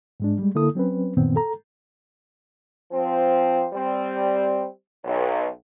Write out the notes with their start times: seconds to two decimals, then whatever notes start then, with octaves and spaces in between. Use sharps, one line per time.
0.20 G#2 G#3 D4
0.39 G3 G#3
0.55 D3 A#3 E4 A4 D#6
0.75 F#3 C4 C#4 B4
1.17 F#2 A#2 D#3 B3 C4
1.36 A4 A#5
2.92 F3 C4
3.73 G3 C4
5.04 B1